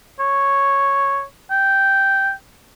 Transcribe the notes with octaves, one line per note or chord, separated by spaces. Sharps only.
C#5
G5